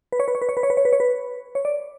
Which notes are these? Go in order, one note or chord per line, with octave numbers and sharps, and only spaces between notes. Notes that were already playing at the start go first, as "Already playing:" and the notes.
B4
C#5
B4
C#5
B4
C#5
B4
C#5
B4
C#5
B4
C#5
B4
C#5
D5